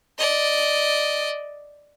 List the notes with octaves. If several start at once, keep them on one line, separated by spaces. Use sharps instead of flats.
D5 D#5